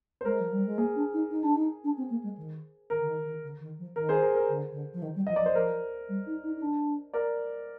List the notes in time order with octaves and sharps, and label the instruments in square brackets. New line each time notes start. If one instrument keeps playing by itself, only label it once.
[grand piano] C5
[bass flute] G#3 [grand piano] A#4
[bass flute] F3
G3
G#3
[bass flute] A#3 [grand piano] G#4
[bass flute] D4
D#4
D#4
D4
D#4
D4
C4
A#3
G#3
D#3
[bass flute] D#3 [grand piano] A#4
[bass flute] D3
D#3
D#3
D3
D#3
F3
[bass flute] D#3 [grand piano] A#4
[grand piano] G#4 C5
A#4
A#4
[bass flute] D3
D3
F3
D#3
G3
[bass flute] F3 [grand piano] D#5
[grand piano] D5
[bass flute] F3
[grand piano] C5
[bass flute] F3 [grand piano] A#4
[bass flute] G3
D#4
D#4
D#4
D4
[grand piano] A#4 D5